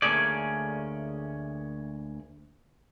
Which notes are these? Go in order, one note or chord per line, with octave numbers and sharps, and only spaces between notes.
D2 A3 A#3 C#4 G#4 D5